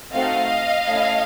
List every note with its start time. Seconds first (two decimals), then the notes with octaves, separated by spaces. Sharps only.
0.12 A3 C4 D#4 F#4 A4 D#5 F5
0.86 A3 C#4 E4